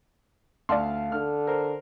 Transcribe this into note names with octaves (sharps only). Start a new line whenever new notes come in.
D2 D5 E5 F5 A5 C6
D3 F6
A#4 C5